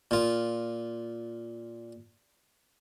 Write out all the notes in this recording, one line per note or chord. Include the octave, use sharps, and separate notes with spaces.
A#2 F4